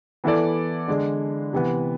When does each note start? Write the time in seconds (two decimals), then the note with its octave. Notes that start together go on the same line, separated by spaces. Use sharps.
0.24 E3 B3 E4 A4 D5
0.88 D3 G#3 D4
1.53 C3 E3 B3